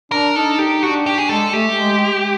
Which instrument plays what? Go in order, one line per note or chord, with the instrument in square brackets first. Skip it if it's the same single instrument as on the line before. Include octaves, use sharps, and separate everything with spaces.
[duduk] D4 [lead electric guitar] A#4
[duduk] D#4 [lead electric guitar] A4
[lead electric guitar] G4
[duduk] D4 [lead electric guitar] F#4
[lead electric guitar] G4
G#4
[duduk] G#3 [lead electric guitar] A4
[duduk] A3 [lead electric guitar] G4
[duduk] G#3